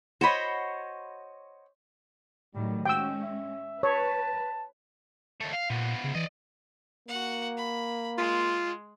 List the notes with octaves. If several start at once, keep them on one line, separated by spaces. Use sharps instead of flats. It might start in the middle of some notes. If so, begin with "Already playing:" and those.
F#4 C5 C#5 D#5 B5
A2 D#3 F#3 G3
G#3 C#4 F#4 G5 E6
E5
B4 C#5 A5
D#2 A3
F5
A#2 F3 B3
C#3
E3 D5 D#5
A#3 F#4 F#5
B5
G#3 F4